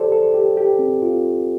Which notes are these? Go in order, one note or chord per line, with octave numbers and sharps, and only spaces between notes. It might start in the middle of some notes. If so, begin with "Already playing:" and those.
Already playing: G4 A4 C5 D5
A4
G4
G4
C4
F4